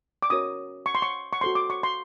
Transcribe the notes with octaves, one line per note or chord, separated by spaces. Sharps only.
D6
C#4 F#4 A#4 C#5 D#6
C#6
C6
C#6
C#6
F#4 A4 C5 C6
D6
C#6
C6